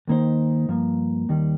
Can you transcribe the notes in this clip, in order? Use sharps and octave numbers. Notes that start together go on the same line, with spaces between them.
D#2 D#3 A#3 D#4 C5
G2 F3 A#3
D#2 D#3 G3